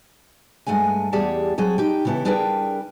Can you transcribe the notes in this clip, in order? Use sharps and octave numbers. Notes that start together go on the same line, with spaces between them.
G2 G#3 A3 F#5 G#5
E2 G3 G4 G#4 F#5 A5
F#3 C4 G#4 A4
D#4 G4 G5
C#3 E3 B3 E4 A4
G3 D4 G#4 A#4 B4 G5